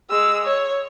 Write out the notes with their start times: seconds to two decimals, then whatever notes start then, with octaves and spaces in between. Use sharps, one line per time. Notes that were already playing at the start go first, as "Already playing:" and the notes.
0.10 G#3 E6
0.46 C#5